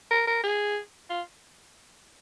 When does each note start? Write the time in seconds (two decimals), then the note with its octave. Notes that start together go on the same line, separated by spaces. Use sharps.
0.11 A#4
0.27 A#4
0.43 G#4
1.10 F4